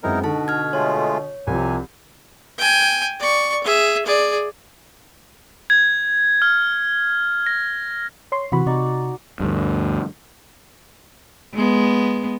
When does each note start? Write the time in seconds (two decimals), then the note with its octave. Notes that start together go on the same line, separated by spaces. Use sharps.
0.03 F#2 G#3 B3 C4 D#4 E4 A#4
0.24 B2 D3 D#4 F#4 A4 A5
0.48 F6 G#6
0.73 G#3 A3 F4 C#5
1.47 C2 C3 F3 G#5
2.58 G5 G#5
3.19 D5 C#6
3.64 G#4 E5
4.06 G#4 D5
5.70 G#6
6.42 F6
7.46 A#6
8.32 C#5 C6
8.52 C3 E3 F#4 B5
8.66 C3 D#4 D5 C#6
9.40 D2 G2
11.55 G#3 B3